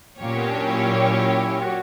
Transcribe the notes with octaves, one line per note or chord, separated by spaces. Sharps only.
A#2 F#3 A#3 C#4 G4 C#5
B3
D4
E4
E4
F#4